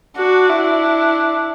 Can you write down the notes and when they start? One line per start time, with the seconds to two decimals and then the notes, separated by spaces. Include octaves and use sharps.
0.16 D4 F#4
0.49 E4